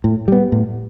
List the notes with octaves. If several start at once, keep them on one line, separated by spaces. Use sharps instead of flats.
A2
G3 B3
A2